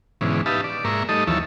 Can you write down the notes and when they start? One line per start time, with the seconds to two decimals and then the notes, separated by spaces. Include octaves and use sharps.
0.21 G#2 B2 D3 E3 C#4
0.46 D#4 G4 B4 E5 F5 A5
0.64 D5
0.85 G#2 A#3 A#4 E5 C#6
1.09 G3 A3 D#4 A4 D#5
1.27 D#2 E3 F3 C#5 E5 A5